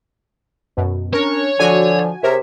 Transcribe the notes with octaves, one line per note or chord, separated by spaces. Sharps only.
F#2 B2
C#4 D4 A#4 C#5
D3 F3 F#4 G#5
C3 G#4 A#4 C#5 E5